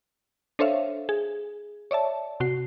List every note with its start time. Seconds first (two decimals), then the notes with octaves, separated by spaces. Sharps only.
0.59 D4 A4 C5 C#5 E5 F5
1.09 G#4
1.91 C#5 D5 E5 A5
2.40 C3 F#4 C7